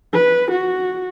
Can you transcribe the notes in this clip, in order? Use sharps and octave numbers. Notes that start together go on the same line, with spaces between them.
B4
F#4